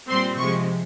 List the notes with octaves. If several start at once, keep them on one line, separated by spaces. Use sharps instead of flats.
A#2 G3 C4 C6
C3 F3 G#3 C#6